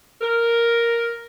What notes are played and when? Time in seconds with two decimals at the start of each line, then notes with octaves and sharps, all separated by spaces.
0.21 A#4